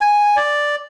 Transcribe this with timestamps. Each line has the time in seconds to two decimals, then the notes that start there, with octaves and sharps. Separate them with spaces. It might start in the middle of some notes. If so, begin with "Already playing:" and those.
0.01 G#5
0.36 D5